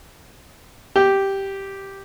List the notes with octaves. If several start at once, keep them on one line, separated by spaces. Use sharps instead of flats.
G4